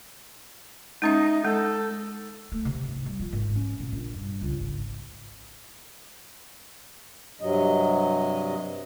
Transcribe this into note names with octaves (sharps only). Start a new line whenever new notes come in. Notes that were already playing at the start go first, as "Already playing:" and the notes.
G#3 C#4 D#4 E5
G#3 A4
A3
C3
G#2
G3
F3
G#1
C#4
B2
A#1
G2
C#2
G#1
G2 C3 F#3 D#5